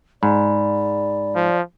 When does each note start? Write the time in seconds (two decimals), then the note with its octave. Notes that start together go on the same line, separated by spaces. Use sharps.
0.23 G#2 D5 B5
1.35 F3